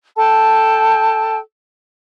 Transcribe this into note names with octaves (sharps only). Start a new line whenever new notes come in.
A4 G5 A5